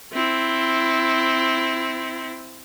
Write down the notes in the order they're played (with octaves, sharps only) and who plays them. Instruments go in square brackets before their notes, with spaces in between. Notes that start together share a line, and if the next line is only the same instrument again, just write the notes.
[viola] C4 E4